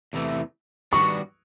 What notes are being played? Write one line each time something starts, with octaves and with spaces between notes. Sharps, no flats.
E2 C3 E3 A3
D#3 G3 B3 D4 F#4 C#6